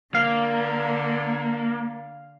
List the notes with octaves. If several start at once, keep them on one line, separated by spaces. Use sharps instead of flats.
D3 A#3 F5